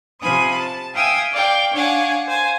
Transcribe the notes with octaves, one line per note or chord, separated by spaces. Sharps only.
C3 F3 G#5 B5 D#6
A5
E5 F5 G5 G#5 D#6 E6
D5 F5 G5
D4 C#5 F5 F#5 G#5
C5 F5 G#5